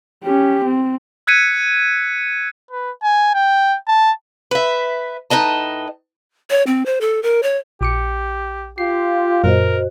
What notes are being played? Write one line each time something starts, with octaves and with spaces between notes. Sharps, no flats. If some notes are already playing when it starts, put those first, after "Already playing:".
C#4 G4
C4
E6 F#6 G#6 B6 C#7 D#7
B4
G#5
G5
A5
B4 E5
A2 D#4 B4 D#5 A5
C#5
C4
C5
A4
A#4
C#5
A#1 G4 D6 C#7
F4 G4 C7
F#2 A#2 F#4 A#4 C5 D#5